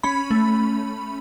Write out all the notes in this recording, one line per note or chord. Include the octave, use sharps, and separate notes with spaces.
C#4 B5
A3